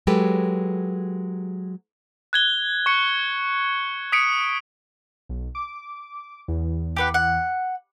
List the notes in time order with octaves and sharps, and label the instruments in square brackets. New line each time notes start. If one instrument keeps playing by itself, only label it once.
[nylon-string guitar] F#3 G#3 G4 A4 B4
[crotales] F#6 G#6 G7
C#6 C#7
D#6 B6 C#7 D7
[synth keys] B1
D6
E2
[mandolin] G4 B4 F#5
F#5